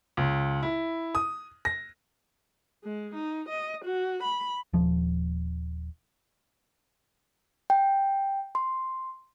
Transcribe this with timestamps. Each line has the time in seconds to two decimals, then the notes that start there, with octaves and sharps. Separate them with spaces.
0.17 C#2
0.63 E4
1.15 D#6
1.65 A#6
2.84 G#3
3.15 D#4
3.49 D#5
3.85 F#4
4.23 B5
4.73 D#1 F3
7.70 G5
8.55 C6